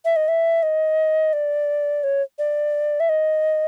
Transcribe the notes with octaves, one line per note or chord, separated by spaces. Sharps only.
E5
D#5
E5
D#5
D5
C#5
D5
E5
D#5